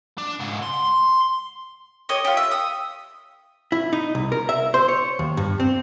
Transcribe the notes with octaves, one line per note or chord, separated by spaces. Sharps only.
D4
C#2 G#2
C6
G4 C#5 D#5
F4 G4
E5
D#6
E4
D#4
C2
A#4
E5
C5
C#5
D#2
G2
C4